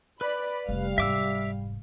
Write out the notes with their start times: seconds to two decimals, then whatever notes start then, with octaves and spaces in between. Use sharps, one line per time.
0.21 B4 D5 B5
0.69 F1 G3 A3 F5
0.98 F1 G#2 E5 D6 E6